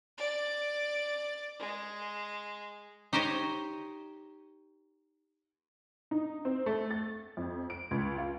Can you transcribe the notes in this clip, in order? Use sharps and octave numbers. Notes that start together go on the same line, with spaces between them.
D5
G#3
D#4 G4 C5 C#5 D#5
D#4
C4
A3
A6
F2
D7
C#2
F4